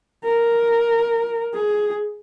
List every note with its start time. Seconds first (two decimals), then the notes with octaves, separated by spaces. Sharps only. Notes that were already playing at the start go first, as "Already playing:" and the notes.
0.25 A#4
1.54 G#4